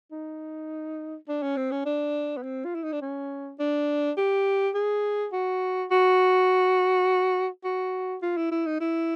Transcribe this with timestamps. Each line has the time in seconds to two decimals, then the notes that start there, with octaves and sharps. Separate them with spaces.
0.12 D#4
1.28 D4
1.43 C#4
1.57 C4
1.71 C#4
1.86 D4
2.37 B3
2.43 C4
2.65 F4
2.75 E4
2.83 D#4
2.93 D4
3.02 C#4
3.59 D4
4.17 G4
4.75 G#4
5.33 F#4
5.91 F#4
7.64 F#4
8.22 F4
8.37 E4
8.51 E4
8.66 D#4
8.80 E4